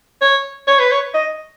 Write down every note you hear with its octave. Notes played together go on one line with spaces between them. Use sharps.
C#5
C#5
B4
C#5
D#5